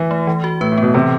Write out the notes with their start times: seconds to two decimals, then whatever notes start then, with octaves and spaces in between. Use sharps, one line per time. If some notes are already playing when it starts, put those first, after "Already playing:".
Already playing: E3
0.11 A3
0.27 E3
0.44 F#4
0.61 A2 B4
0.72 A2
0.78 B3
0.83 B2
0.94 C3 E3